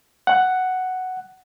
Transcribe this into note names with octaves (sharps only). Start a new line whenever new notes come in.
F#5